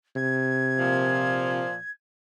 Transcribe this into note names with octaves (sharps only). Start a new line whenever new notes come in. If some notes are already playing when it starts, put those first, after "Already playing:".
C3 G#6
A#2 F3